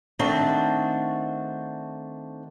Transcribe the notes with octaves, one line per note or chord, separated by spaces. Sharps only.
D#3 A3 C4 D4 F#4